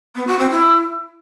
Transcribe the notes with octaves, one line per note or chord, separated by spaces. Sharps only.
B3
F#4
C4
E4